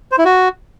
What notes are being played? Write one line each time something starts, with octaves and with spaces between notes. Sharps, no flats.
C5
E4
F#4